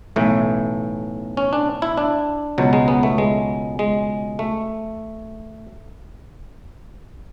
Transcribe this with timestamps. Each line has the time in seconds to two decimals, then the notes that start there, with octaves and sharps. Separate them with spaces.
0.16 B1 A2 E3 A3
1.37 C#4
1.53 D4
1.82 E4
1.97 D4
2.58 C#2 B2 F#3
2.73 G#3
2.88 B3
3.03 A3
3.18 G#3
3.79 G#3
4.39 A3